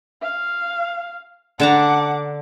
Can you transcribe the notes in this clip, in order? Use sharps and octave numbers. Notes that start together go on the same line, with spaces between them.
F5
D3 F#5 A5 A#5 D6